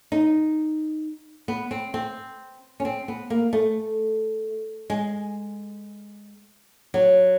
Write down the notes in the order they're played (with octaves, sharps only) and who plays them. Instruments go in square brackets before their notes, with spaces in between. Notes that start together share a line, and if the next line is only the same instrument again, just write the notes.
[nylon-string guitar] D#4
B3
C4
C4
C#4
C4
B3
A#3
A3
G#3
F#3